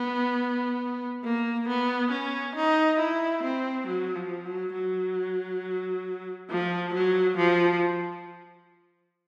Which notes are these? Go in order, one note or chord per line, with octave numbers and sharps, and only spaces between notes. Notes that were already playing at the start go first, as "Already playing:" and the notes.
Already playing: B3
A#3
B3
C#4
D#4
E4
C4
F#3
F3
F#3
F#3
F3
F#3
F3